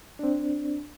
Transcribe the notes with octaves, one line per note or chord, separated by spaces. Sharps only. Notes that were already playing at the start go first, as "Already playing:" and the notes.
C4 D4